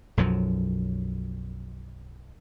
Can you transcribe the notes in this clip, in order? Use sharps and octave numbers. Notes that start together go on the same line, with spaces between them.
B1 F#2 F3 F#3